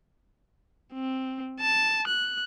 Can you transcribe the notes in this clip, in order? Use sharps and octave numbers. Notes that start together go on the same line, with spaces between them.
C4
A5
F#6